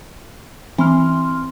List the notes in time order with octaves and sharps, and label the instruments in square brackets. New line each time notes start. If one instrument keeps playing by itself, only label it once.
[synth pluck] E3 [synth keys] C4 C6 F6